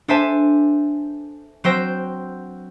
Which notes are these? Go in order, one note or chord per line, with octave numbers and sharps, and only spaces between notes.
D4 A4 C5 E5 G#5 A5
F#3 C4 C5 G5 E6 A#6